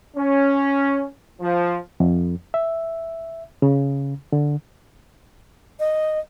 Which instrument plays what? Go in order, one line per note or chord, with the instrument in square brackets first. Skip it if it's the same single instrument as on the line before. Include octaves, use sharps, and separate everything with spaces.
[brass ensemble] C#4
F3
[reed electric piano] F2
E5
C#3
D3
[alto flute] D#5